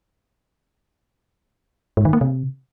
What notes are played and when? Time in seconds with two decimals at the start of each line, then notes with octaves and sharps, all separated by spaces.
1.97 G#2
2.05 D#3
2.13 A#3
2.21 C3